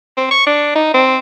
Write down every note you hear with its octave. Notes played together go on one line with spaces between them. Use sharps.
C4
C#6
D4
D#4
C4